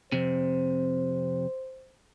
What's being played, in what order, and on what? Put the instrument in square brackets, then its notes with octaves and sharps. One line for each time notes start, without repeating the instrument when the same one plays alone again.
[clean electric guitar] F2 C3 [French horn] C5